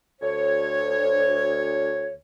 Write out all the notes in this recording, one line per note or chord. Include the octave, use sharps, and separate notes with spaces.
D2 C#5